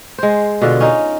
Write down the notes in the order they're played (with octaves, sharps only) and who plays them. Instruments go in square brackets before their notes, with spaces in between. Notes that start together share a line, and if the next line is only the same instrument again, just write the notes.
[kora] G#3 C5
B2 D3 F4
C#4 D#4